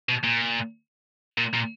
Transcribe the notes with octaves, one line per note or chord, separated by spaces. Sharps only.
B2
A#2
A#2
A#2